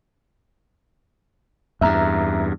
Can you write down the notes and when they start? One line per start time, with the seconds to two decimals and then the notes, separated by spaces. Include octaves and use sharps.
1.81 E2 G2 E5 A#5